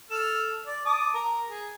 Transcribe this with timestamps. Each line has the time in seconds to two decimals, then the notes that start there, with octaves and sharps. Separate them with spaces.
0.11 A4 F6
0.66 D5
0.86 A5 D6 D#6
1.14 A#4
1.48 G#4